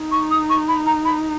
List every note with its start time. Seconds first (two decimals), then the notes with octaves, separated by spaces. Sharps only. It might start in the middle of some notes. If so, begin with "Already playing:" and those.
Already playing: D#4
0.12 C#6
0.31 D#6
0.50 C#6
0.68 B5
0.86 A#5
1.05 B5